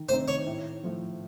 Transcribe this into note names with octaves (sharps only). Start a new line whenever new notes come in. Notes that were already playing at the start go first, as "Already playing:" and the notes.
Already playing: D#3
A3 C4 D#4 C5
C#5
A2
F3 A3